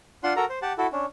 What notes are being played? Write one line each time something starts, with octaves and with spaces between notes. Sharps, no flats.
D4 F4 F#5 C6
F#4 A4 A#4 A#5
C5
G4 F#5 A5
E4 F#4 A4
C#4 D4